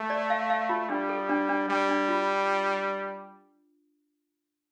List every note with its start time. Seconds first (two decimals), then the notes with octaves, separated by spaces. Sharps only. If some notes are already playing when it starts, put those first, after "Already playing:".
Already playing: A3
0.10 D5
0.30 F5
0.50 F5
0.69 F4
0.89 G3 D4
1.09 A4
1.29 D4
1.49 D4
1.68 G3 D4
1.89 D4
2.09 F4